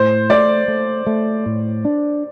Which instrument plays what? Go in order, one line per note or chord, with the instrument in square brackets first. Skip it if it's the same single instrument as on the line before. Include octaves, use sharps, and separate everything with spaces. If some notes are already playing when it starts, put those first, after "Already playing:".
Already playing: [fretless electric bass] A2 [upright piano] C5
[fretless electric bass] A3 [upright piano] D5
[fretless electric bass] A3
A3
A2
D4